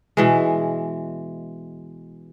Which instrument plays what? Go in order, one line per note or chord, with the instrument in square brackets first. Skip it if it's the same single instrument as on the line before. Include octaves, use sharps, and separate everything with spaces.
[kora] B2 E3 G#3